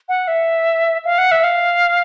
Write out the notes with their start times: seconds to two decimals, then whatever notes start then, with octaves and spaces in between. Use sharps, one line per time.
0.08 F#5
0.28 E5
1.05 F5
1.18 F#5
1.31 E5
1.43 F5